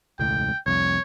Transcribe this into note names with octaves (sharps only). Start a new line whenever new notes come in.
E1 C#2 A2 G5
C2 F2 C#5